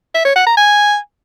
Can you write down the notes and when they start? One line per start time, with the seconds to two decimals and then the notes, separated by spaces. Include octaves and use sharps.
0.14 E5
0.25 C#5
0.36 F#5
0.46 A#5
0.57 G#5